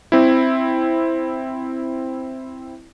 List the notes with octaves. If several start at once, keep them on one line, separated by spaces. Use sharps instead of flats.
C4 E4